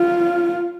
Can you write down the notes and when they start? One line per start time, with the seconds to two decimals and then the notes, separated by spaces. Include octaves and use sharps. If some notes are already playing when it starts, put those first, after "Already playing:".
Already playing: F4